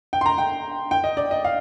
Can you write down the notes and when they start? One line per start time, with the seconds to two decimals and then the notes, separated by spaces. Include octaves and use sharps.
0.13 G5
0.21 C6
0.26 A#5
0.38 G5
0.91 G5
1.04 D#5
1.17 D5
1.31 D#5
1.44 F5